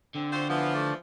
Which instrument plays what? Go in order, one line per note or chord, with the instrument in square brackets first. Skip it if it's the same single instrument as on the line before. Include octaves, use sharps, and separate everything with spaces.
[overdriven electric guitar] D3 [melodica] C4
[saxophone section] F4 F#4 C5
[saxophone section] E3 F3 [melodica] B3
[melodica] A3 D5